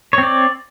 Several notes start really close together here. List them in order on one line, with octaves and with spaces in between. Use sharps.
C#5 C4 D5